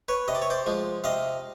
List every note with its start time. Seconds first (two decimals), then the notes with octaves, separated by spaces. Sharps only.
0.08 B4 C#5
0.28 C3 D#5
0.35 D5
0.42 C#5
0.50 C5 D5
0.66 F3 G#3
1.04 C3 D#5 F5